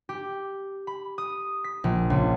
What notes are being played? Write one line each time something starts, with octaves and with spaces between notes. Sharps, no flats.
G4
B5
D#6
B6
A#1
C#2